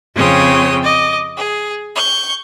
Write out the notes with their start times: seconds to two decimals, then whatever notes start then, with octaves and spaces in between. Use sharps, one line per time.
0.15 F2 C#3 C4 C#5 G5 D#6
0.82 D#5 D6
1.35 G#4
1.95 C#6 G6